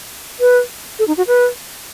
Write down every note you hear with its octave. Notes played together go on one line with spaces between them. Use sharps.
B4
A4
D#4
F#4
B4